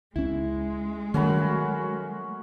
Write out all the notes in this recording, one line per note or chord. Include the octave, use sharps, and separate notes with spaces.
C#2 G#3 C#4 E4
D#3 F#3 G3 A3 A#3 C#4 F#4 B5